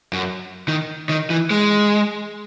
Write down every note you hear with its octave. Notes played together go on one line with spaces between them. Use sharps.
F#2
D#3
D#3
E3
G#3